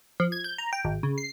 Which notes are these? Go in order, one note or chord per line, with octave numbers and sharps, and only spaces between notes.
F3
G#6
G6
A#5
G5
G#1
C#3
C7